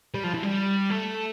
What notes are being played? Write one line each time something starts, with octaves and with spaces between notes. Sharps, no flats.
G3
F3
E3
G3
A3